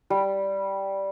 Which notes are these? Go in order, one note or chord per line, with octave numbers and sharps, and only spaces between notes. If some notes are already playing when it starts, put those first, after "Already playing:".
G3